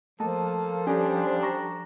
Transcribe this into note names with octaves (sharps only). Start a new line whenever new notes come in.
F3 A3 A#3 A4 A5
G3 C#4 D4 G4 A4 G#5
A#5 C#6 A#6